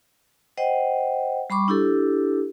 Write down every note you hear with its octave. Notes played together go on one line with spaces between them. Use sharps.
C5 D#5 F#5 G5
G3 B5 C#6 D6
D4 E4 G4 A4